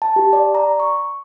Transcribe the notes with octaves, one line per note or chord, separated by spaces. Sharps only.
A5
G4
D5
A#5
C#6